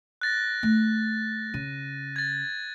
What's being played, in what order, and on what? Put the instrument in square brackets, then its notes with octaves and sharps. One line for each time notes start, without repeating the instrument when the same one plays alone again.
[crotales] F#6 A6 A#6
[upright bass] A3
[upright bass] C#3 [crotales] D#7
[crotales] G#6 A6